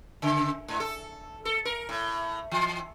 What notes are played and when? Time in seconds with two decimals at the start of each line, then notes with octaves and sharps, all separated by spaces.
0.22 C#3
0.68 G#2
0.80 A4
1.45 A4
1.65 A#4
1.89 A2
2.51 E3